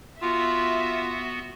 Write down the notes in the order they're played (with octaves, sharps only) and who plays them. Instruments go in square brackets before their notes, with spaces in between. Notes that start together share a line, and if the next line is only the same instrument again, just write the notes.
[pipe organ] B3 F#4 [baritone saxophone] F4 [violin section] E5